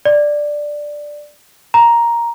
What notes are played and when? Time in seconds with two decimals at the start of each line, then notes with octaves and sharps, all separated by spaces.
0.05 D5
1.74 A#5